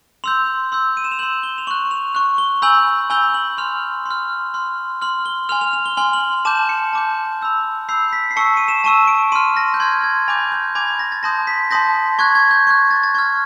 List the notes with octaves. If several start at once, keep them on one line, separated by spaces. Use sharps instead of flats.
C6 E6 G6 F7
C6 E6 G6
D#7
E7
F7
C6 E6 G6 F#7
G7
F7
C#6 F#6 F#7
F7
C#6 F#6
G7
G#5 B5 E6 G6 F#7
G#5 B5 E6 G6 G7
F#7
C6 F6 F7
C6 F6
C6 F6
C6 F6 F#7
G7
G#5 C6 F6 F7
F7
F7
G7
G#5 C6 F6 G7
F#7
A5 D6 G6 E7
C#7
A5 D6 G6
B5 E6 G6
B5 E6 G6 C7
B6
C7
A5 C#6 E6 C#7
D#7
E7
A5 C#6 E6 D#7
D7
C6 F6 D#7
A#6
G6
C6 F6 G#6
G#6
G#5 B5 D6 G6 A6
G6
G#5 B5 D6 G6 G#6
A#6
A6
A5 C6 D#6 G6 A#6
B6
A5 C6 D#6 G6 A#6
C#6 F#6 G#6
G#6
G6
C#6 F#6 G#6
A6
A6
C#6 F6 G#6